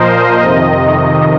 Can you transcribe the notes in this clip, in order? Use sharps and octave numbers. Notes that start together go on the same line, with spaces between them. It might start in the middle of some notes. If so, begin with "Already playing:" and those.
Already playing: A#2 F3 A#4 C5 D#5
F2 C3 D#3